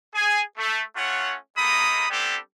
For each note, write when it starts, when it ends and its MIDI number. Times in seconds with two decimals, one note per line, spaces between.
0.14 0.42 68
0.14 0.42 80
0.58 0.83 57
0.96 1.35 57
0.96 1.35 61
0.96 1.35 65
0.96 1.35 73
0.96 1.35 78
1.58 2.07 56
1.58 2.07 58
1.58 2.07 63
1.58 2.07 69
1.58 2.07 83
1.58 2.07 87
2.10 2.38 55
2.10 2.38 59
2.10 2.38 60
2.10 2.38 62
2.10 2.38 67
2.10 2.38 69